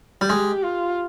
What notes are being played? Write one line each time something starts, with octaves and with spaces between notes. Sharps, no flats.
G3
G#3 G4
F4